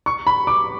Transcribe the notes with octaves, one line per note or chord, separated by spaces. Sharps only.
C#6
B5
D6